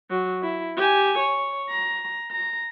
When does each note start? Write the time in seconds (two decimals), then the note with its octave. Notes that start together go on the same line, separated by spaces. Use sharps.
0.10 F#3
0.42 E4
0.77 G4 G#5
1.19 C#5
1.69 A#5
2.31 A#5